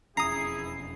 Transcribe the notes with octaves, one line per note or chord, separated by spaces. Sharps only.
E1 F2 C#4 E4 G#4 A#5 D#6 C7